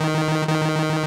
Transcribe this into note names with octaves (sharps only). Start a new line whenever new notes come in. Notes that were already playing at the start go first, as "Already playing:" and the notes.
Already playing: D#3
D#3